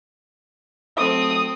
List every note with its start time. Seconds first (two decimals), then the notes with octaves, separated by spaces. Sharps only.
0.98 F#3 A3 C4 A4 D#6